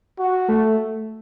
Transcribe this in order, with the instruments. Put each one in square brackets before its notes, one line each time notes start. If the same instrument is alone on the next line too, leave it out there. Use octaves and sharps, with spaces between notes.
[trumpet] F#4
[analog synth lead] A3